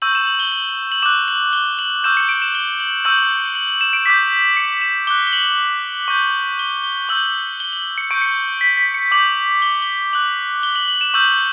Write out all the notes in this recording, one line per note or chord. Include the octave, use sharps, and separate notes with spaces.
C#6 E6 G6 F#7
E7
F#7
G7
F#7
F#7
D6 F#6 E7
F#7
G7
F#7
C#6 E6 G6 E7
C#7
D7
E7
G7
F#7
C#6 E6 G6 F#7
F#7
F#7
E7
D7
D6 G6 B6
C#7
E7
D6 F#6 G7
G7
F#7
C#6 G6
G7
G7
C#6 E6 G6 F#7
G7
F#7
C#7
C#6 G6 D7
C#7
B6
B6
C#7
D6 G6 F#7
G7
F#7
G7
D6 F#6 F#7
G7
F#7
F#7
E7
C#6 E6 G6 F#7